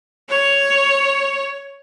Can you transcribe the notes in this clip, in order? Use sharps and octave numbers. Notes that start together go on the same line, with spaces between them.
C#5